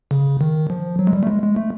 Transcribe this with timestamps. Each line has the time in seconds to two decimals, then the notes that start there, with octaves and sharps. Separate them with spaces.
0.11 C#3
0.41 D#3
0.70 F3
0.99 F#3
1.07 G#3
1.13 G3
1.23 A3
1.27 G#3
1.43 G#3
1.56 A3